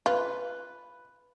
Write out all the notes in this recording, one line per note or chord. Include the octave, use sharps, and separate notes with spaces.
F4 B4